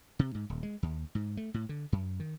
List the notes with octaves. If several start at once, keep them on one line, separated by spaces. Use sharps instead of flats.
C3
G#2
D#1
G#3
D#2
G#2
A3
A2
D3
F#2
D#3